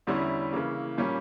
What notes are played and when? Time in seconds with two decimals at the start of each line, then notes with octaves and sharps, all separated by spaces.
0.07 E2 D3 G3 C#4 E4
0.52 C#3 E3 A#3
0.98 A#2 G3 A#3 C#4